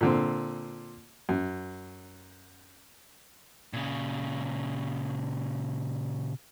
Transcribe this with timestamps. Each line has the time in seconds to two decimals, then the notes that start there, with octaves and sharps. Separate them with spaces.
0.01 A#2 D3 C4
1.29 F#2
3.73 A#2 C#3